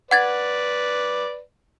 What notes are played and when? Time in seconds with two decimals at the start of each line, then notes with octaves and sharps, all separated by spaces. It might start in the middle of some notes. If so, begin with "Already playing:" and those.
0.11 B4 D5 F#5 G#6 A6